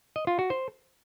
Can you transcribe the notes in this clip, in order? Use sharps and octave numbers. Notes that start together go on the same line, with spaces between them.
D#5
F4
F#4
C5